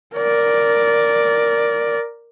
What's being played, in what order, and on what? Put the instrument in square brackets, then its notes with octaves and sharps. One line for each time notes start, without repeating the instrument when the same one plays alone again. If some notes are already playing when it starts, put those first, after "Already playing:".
[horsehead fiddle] A#4 D5